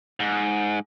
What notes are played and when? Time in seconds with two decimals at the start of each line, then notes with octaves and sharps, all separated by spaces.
0.20 G#2